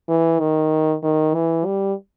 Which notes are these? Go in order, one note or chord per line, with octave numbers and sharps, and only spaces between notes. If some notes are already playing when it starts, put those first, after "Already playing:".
E3
D#3
D#3
E3
G3